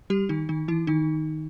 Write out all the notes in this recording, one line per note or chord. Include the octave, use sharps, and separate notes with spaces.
G3 G4
D#3 D#4
D#3 D#4
E3 E4
D#3 D#4